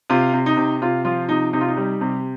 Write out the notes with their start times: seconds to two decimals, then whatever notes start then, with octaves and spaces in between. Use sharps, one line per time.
0.10 C3 F4
0.33 C3
0.46 D#4
0.57 C3
0.82 C3 F4
1.05 F3 F4
1.29 C3 D#4
1.53 C3 D#4
1.61 F4
1.68 D#4
1.77 G3
2.01 C3